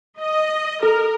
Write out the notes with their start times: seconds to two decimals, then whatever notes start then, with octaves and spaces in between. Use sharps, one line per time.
0.20 D#5
0.83 A4 A#4